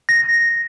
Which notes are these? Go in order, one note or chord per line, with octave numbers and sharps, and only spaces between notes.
A#6